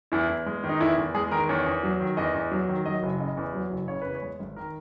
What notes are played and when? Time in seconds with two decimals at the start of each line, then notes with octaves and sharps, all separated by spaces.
0.12 E2 E4
0.29 E2
0.46 G#3
0.64 D#3
0.69 D#4
0.81 E2 E4
0.98 E2
1.15 G#3 G#4
1.31 D#3 A#4
1.49 E2 C#5
1.66 E2
1.83 F#3
2.00 D#3
2.17 E2 D#5
2.34 E2
2.52 F#3
2.69 D#3
2.86 F#3 D#5
3.03 F#1
3.20 C#3 D#5
3.37 E2
3.54 F#3
3.71 F#1
3.88 C#3 C#5
4.02 E2 B4
4.15 C#5
4.22 G#3
4.39 G#1
4.56 D#3 A#4